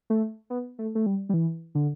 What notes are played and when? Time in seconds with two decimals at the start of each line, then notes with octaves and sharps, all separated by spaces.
0.10 A3
0.50 B3
0.79 A3
0.95 A3
1.06 G3
1.29 G3
1.34 E3
1.75 D3